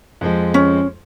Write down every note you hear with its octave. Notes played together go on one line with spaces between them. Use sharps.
F2 F3 G#3
C#4